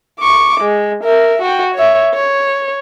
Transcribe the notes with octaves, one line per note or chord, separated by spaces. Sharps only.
C#6 D6
G#3
A#4 E5
F#4 G5
C#5 E5
C#5